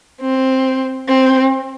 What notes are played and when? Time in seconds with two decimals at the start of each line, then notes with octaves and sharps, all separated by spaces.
0.21 C4
1.08 C4